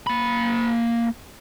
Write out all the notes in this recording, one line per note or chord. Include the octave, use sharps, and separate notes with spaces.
A#3 B5